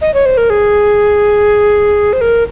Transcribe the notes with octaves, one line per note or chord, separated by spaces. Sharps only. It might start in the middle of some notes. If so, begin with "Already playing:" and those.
D#5
C#5
C5
A#4
G#4
C5
A#4